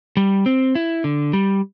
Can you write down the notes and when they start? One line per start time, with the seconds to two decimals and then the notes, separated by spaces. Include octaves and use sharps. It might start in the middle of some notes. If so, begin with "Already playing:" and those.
0.17 G3
0.46 C4
0.75 E4
1.04 D3
1.33 G3